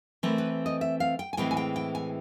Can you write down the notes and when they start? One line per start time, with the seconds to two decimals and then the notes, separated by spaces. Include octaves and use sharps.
0.23 E3 A3 C4 A#4
0.38 B4
0.66 D#5
0.81 E5
1.00 F5
1.19 G5
1.33 G#5
1.37 A2 E3 G#3 C4 G5
1.51 G#5
1.57 G5
1.76 G5
1.95 G#5